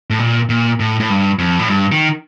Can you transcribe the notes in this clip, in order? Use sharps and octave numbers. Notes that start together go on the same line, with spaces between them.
A2
A#2
A#2
A2
A2
G2
F2
A2
G2
D#3